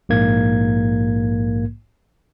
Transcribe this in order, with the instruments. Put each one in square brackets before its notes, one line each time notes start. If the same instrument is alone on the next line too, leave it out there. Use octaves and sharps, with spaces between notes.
[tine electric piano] A#1 G#2 A#3 G#6